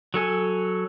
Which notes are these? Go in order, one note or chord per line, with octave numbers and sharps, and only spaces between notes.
F#3 A4 G#5